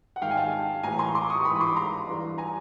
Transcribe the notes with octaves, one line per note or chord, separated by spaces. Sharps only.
F#5
G#2 D#3 F5 G5
G#5
G5 A5
A2 E3 G#5 A#5
A#5 C6
C6 D6
C#6 D#6
G#2 E3 B5 C#6
D#6
C6 D6
A#5 C6
G2 E3
G#5 A#5